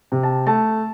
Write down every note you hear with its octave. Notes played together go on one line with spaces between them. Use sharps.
C3
A5
A3 A5